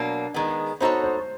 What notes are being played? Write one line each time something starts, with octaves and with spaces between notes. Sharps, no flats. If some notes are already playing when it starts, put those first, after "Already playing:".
Already playing: B2 F#3 A#3 D4
D#3 G#3 B3
B3 D#4 F#4 A4 C5 C#5
C5